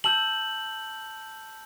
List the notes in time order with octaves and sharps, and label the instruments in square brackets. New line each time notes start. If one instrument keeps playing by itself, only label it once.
[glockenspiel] A5 E6 G6 F#7